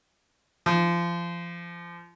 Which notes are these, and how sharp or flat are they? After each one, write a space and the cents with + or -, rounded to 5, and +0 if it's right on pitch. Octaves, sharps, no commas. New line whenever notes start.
F3 -25